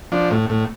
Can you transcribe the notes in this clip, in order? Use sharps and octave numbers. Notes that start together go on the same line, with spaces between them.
F3 D4
A2
A2